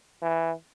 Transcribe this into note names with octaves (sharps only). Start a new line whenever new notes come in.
E3